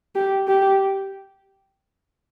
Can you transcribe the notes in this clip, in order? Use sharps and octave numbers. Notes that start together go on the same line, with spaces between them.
G4
G4